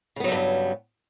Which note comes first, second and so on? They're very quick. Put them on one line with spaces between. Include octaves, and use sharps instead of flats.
C#3 B3 F#3 G3 G2